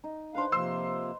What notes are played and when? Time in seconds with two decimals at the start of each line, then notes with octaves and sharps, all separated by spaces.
0.04 D#4
0.35 D4 B4 C5 F5
0.52 C3 F3 A#3 C6 E6